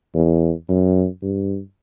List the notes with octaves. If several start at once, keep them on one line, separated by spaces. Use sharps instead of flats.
E2
F#2
G2